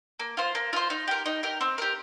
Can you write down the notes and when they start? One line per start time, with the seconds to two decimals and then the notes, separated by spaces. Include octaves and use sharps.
0.20 A#3
0.37 F4 C5
0.55 A#3
0.73 F4 C5
0.90 D#4
1.07 G4 A#4
1.26 D#4
1.43 G4 A#4
1.61 C4
1.78 G4 A#4